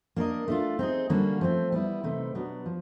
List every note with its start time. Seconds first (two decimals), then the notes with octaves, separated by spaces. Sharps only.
0.16 A#3 D4 F#4 A#4 D#5
0.48 A3 D4 F4
0.79 C4 D#4 G#4
1.10 D3 G3 A#3 C#4 F#4
1.41 F3 A3 C4
1.72 G3 B3 E4
2.04 C3 E3 A3 C4 D#4
2.35 B2 F#3 B3 D4 G4
2.66 F3